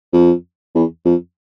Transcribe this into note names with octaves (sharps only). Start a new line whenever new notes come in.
F2
E2
F2